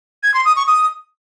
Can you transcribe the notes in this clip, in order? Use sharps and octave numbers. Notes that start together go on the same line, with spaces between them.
G#6
C6
D#6
C#6
D#6